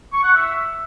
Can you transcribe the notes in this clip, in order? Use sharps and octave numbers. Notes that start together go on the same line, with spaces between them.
C#6
F#5
E5